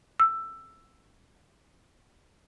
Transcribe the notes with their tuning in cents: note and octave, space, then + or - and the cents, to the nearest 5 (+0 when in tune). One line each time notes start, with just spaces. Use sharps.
E6 +10